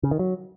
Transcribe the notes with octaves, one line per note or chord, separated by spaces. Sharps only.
C#3
D#3
F#3